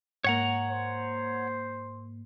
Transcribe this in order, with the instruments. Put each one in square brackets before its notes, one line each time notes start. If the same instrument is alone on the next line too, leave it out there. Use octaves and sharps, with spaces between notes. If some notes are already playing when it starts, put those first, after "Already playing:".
[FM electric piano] G#2 A#3 [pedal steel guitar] C#5 F#5 A#5
[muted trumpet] C5